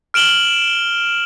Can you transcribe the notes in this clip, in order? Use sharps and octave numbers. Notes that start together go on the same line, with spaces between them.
F6 D7 E7 F#7 G7